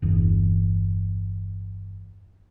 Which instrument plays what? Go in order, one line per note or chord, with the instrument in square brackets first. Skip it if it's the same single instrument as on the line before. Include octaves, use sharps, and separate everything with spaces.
[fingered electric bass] G1 E2